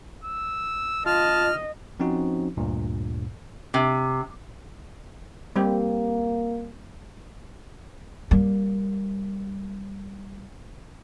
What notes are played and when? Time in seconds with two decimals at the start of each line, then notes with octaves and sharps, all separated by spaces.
0.24 E6
1.06 F4 D#5 A5 F6
2.00 F3 C4 C#4 D#4 F#4
2.57 D2 G2 A#2
3.74 C3
5.56 G3 A#3 C4 G4
8.31 G3 A#3